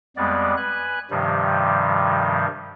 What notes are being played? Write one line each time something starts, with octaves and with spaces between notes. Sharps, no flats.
F2 G3 G#3 B3 D5
B4 G#5 F#6
G2 C3 D#3 F3 G3